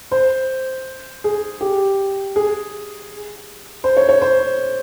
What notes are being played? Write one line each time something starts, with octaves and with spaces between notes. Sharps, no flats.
C5
G#4
G4
G#4
C5
C#5
C#5
C5